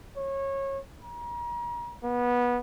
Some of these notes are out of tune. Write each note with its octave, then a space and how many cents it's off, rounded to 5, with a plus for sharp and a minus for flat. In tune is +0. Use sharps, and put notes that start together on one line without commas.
C#5 -25
A#5 +35
B3 -20